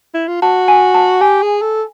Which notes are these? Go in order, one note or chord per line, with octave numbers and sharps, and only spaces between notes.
E4
F4
F#4 A5
G#5
A5
G4 G#5
G#4
A4